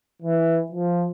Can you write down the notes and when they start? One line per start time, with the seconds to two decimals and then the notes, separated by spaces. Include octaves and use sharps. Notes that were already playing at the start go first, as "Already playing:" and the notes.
0.22 E3
0.72 F3